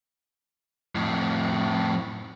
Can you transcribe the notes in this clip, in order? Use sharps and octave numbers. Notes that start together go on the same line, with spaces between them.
F2 A2